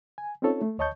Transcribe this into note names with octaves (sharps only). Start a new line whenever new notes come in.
G#5
C4 C#4 D#4 F4 A4 C#5
A3
D2 C#5 D#5 A5 C#6 G6